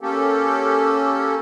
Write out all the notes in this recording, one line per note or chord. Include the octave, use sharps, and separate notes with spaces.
A#3 C#4 G4 A4